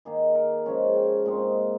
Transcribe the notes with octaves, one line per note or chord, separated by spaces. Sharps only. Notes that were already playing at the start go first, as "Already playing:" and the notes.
D#3 A#3 D#4 G#4
A#4
C#3 F3 G#3 C#4 C#5
G5
A#2 G#3 C4 D#4 F5